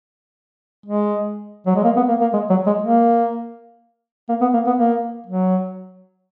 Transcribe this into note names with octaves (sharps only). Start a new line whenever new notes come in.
G#3
F#3
G#3
A#3
B3
A#3
A#3
G#3
F#3
G#3
A#3
A#3
B3
A#3
B3
A#3
F#3